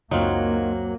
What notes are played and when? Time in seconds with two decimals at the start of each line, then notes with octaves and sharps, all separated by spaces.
0.11 C#2 F#2 F#3 A#3 C4 D#4 F4 F#4